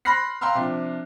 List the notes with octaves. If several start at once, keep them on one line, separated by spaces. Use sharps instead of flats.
B5 C6 F6 F#6 A#6 C7
F5 G5 A#5 C6 E6 F6
C3 F3 D4